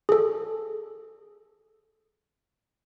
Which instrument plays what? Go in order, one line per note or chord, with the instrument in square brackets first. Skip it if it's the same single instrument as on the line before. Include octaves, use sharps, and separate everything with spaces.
[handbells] G#4 A4